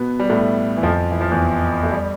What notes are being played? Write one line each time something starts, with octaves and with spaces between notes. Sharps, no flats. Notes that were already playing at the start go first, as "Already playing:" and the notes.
Already playing: B2 B3
G3
A2 A3
E3
F2 F3
E3
F3
E2 E3
A3
G3